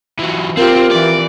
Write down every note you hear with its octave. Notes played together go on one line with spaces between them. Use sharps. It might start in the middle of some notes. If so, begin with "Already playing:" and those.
E3 F#3
C4 F4 G4 A#4
E3 D5